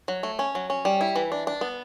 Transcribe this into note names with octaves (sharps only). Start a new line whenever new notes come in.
F#3
A3
C#4
F#3
C#4
G3
E4
E3
D4
D4
B3